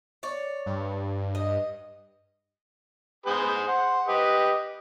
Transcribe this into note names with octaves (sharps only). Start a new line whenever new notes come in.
C#5 D5
G2
D#5
B3 G#4 C5 C6
C5 F#5
G4 B4 D#5